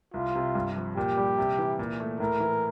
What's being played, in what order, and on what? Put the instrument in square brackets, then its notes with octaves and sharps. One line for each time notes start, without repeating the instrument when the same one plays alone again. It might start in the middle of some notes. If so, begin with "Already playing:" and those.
[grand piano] C2 [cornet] F4
[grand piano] C3
G2
F3
[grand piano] A#2 [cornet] G4
[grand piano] G3
C3
E3
A#2
A3
[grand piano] A2 [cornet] A#4
[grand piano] E3